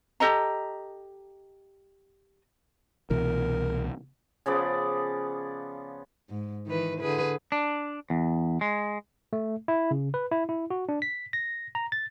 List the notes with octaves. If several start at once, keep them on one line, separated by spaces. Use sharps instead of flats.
G4 A4 D#5 A#5
C2 B2 E3 A#4
C#3 F3 B3 D5
G#2
D#3 E3 B4
D3 G#4 B4
D4
E2
G#3
A3
E4
C#3
B4
E4
E4
F#4
D4
B6
A#6
A#5
A6